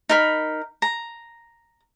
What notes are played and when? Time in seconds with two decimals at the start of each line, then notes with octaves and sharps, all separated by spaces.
0.09 D#4 A#4 B5
0.82 A#5